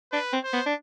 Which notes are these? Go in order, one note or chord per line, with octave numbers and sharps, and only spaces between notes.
D4 B4
C4
C5
B3
D4